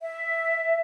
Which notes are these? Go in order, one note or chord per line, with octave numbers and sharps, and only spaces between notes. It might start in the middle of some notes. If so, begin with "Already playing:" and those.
E5